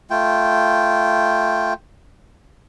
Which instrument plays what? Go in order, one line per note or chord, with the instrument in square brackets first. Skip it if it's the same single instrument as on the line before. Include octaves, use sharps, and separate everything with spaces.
[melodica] A3 F4 G5